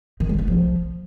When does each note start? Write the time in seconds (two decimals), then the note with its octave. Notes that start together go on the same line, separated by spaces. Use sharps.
0.20 D#3
0.29 G#3
0.38 B3
0.48 F3